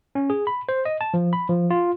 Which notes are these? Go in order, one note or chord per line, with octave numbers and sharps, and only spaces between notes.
C#4
G#4
B5
C5
D#5
A5
F3
B5
F3
F4